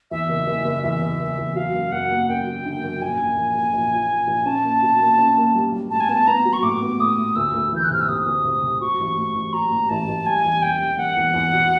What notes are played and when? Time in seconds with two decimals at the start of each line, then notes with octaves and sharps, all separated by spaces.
0.11 E2 E5
0.29 F#1
0.47 F#1
0.65 F#1
0.83 E2 E5
1.02 F#1
1.20 F#1
1.38 E2
1.55 F#3 F5
1.74 F#2
1.92 F#2 F#5
2.11 A#3
2.29 F#2 G5
2.46 F#3
2.65 D3
2.83 F#2
3.02 A#1 G#5
3.19 A#1
3.37 A#1
3.55 A#1
3.73 A#1
3.92 F3
4.10 A#2
4.28 A#1
4.45 C#4 A5
4.64 A#3
4.82 B2
5.01 A#3
5.18 C#4
5.37 A#3
5.55 G3
5.72 G3
5.91 A2 A5
6.00 G#5
6.09 B3 A5
6.27 B3 A#5
6.45 F#3
6.53 C#6
6.63 A2 D6
6.82 B3
6.99 A2 D#6
7.18 A2
7.36 D2 E6
7.54 D2
7.73 E3 G6
7.84 F#6
7.90 C3 F6
8.01 E6
8.08 C3 D#6
8.26 D2
8.45 C3
8.63 C3
8.80 F#3 C#6
8.99 A1
9.17 A2
9.35 A1
9.53 F#3 A#5
9.71 A2
9.89 A1 A5
10.08 A1
10.25 G3 G#5
10.45 E2
10.62 E1 G5
10.81 G3
10.98 E1 F#5
11.17 E2
11.34 E2
11.53 B2